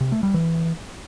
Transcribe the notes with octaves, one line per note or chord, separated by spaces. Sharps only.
C3
A3
G3
E3